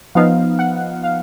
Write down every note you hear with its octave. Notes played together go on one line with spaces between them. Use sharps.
F3 B3 D#4 F5
F#5
F5